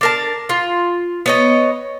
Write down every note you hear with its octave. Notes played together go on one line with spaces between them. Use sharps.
D4 A#4 A5
F4
B3 C#5 D#5